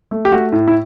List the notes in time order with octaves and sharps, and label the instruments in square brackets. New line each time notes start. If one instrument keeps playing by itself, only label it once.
[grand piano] A3
G4
A3 F#4
A2
E4